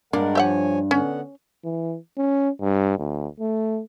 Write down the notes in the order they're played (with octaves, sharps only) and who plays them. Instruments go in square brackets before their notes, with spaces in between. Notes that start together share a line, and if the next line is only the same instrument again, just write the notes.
[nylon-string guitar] G2 D4 [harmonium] G#3 A#4 F#5 [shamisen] A#3
[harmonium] F3 C#5 G#5 [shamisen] G4 E5 F#5
[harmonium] D3 B3 F#5 [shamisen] C#4
[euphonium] E3
C#4
G2
D2
A3